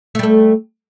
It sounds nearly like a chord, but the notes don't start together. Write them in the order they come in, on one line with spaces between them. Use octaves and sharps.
A3 G3 A4